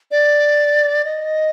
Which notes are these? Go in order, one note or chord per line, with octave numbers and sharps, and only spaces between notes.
D5
D#5